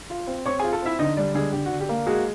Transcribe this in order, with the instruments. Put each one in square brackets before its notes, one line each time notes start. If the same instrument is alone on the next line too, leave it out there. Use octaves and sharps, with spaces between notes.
[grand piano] F4
C4
[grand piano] C4 [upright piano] C#5 C#6
[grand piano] F4 [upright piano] G#4 G#5
[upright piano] A4 A5
[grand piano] C4 [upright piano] E4 E5
[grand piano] D3 [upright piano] D#4 D#5
[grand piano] G3 [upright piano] D4 D5
[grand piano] D3 [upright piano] G#3 G#4
[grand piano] D3 [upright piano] G4
[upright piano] F#4
[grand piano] D3
[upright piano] G4
[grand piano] A#3
[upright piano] G#3 G#4 [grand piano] F#4